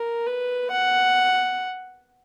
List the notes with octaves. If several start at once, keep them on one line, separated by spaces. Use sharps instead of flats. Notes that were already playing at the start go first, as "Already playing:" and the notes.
Already playing: A#4
B4
F#5